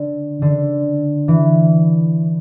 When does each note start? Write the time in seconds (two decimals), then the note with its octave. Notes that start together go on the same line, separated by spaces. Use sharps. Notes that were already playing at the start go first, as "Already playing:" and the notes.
Already playing: D3
0.42 D3
1.28 E3